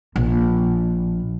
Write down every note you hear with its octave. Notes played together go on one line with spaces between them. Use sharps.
A#1